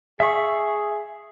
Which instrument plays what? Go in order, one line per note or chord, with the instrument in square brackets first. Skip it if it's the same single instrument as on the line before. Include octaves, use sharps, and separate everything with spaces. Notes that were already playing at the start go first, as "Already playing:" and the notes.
[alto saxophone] G#4 [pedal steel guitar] E5 C#6